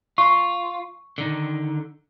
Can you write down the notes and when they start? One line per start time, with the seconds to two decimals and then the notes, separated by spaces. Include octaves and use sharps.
0.18 F4 C#6
1.18 D3 D#3